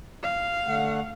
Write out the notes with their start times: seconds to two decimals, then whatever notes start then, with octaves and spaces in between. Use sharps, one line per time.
0.23 F5
0.67 D3 A3 F#5